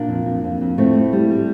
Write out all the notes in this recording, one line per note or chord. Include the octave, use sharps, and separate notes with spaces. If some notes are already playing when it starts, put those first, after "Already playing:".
Already playing: A#2 A#3 D4
F2
F2
F2
F2
A2 A3 C4
A2
G3
G3